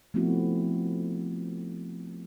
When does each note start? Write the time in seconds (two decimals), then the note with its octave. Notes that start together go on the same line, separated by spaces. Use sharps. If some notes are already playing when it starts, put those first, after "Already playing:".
0.14 F3 A3 B3 C4 E4 F#4